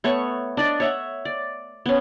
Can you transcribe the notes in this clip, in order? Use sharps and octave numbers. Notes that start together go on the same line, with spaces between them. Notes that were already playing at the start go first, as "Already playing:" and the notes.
A3 B3 C#5 C#6
D4 D5 D#5
C#5 E5 F#5
D5
B3 C#4